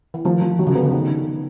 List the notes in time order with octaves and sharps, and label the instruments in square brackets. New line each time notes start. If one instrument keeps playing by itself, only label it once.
[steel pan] E3
[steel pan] D#3 [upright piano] F3
[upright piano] F3
[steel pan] D#3 [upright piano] F#3
[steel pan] C#3
[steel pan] D3 [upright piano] B3
[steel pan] C#3
[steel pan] D3 [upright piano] D#3